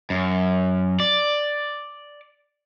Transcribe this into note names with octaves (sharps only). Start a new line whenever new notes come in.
F#2
D5